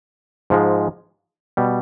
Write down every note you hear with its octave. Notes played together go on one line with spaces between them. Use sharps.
G#2 F3 G#3
B2 G3